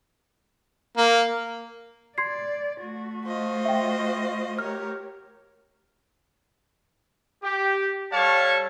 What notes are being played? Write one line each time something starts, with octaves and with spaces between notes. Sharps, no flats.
A#3
D5 C6 G#6 C7
A3 F#4
F4 C5 D#5
E5 G5
G4 A#4 C#5 F6
G4
G3 A4 C#5 F5 A5 C#6